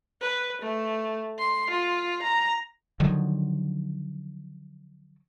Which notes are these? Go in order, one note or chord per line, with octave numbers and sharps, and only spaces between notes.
B4
A3
C6
F4
A#5
D3 D#3 F3 F#3